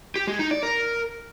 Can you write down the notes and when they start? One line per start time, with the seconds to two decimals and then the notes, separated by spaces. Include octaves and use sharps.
0.16 G4
0.27 G#3
0.39 D#4
0.51 D5
0.63 A#4